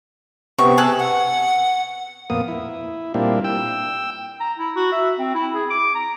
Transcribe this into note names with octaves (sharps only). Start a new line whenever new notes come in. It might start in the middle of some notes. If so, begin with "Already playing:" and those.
C3 B3 C4 C#6
G#4 A4 F#6
F#5
F2 A#2 A#3 B3 D#6
E4
A#2 G3 A#3 C4 D4 E4
G5 E6
A#5
E4
F#4
E5
C4
E4
G#4
D6
A#5